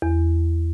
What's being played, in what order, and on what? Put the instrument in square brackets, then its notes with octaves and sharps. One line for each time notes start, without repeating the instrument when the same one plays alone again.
[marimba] E2